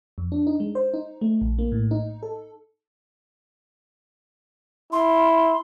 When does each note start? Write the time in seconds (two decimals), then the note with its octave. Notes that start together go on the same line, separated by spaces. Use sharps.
0.18 F2
0.32 D4
0.47 D#4
0.60 G#3
0.75 C5
0.94 D#4
1.21 A3
1.41 A#1
1.59 A#3
1.72 A2
1.91 D#4
2.23 A4
4.92 E4 C6